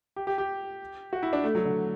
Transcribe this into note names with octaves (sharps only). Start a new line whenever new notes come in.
G4
G4
G4
F#4
E4
D4
A3
F#3
D3